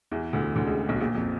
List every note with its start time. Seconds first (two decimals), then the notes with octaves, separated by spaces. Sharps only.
0.11 E2 E3
0.33 D2 D3
0.56 D2 D3
0.66 C#2 C#3
0.89 B1 B2
1.00 A#1 A#2
1.15 F2